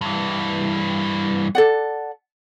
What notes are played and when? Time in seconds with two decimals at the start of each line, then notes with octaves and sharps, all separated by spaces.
0.01 G2 E3
1.55 A4 D5 F#5